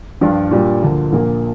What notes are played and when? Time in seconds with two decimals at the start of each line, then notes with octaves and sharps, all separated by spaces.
0.21 G2 F3 D4 F4
0.51 A#2 G3 D4 F4
0.82 D2 D3 F3 A#3
1.12 A#1 A#2 A#3